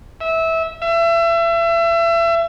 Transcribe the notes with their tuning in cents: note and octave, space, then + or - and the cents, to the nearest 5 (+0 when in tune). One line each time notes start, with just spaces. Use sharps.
E5 -20
E5 +30